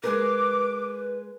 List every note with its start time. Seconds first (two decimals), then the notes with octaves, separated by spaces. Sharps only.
0.03 G#3 G#4 A#4 B4 D6